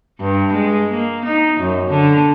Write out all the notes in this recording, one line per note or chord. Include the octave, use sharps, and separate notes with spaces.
G2
G#3
A#3
D#4
F#2
D3